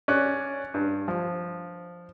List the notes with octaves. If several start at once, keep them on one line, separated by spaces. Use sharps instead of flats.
C#4 D5 F#6
G2
F3